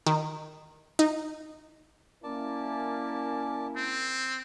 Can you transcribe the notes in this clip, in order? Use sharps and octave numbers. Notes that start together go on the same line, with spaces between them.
D#3
D#4
A#3 C#4 E4 A#4 D5 A5
C4